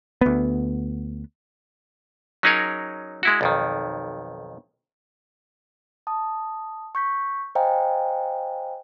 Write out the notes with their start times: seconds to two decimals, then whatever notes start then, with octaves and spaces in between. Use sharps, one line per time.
0.21 D2 B3
2.43 F#3 C#4 D#4 G#4 A#4 C#5
3.23 G#3 E4 F#4
3.41 B1 F2 D#3
6.07 A5 D#6
6.95 C#6 G6 B6
7.55 C5 D#5 F5 G5 G#5 A#5